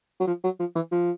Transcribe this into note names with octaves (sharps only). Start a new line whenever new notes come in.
F#3
F3
F#3
F3
E3
F3